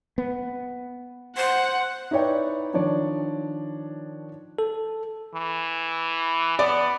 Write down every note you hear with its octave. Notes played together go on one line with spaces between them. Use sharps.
B3
C5 F#5
D#4 E4 B4 C#5 D5 G5
D#3 F3 D4 C#5 D5
A4
E3
B3 D5